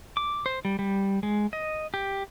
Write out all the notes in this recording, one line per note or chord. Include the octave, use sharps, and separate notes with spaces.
D6
C5
G3
G3
G#3
D#5
G4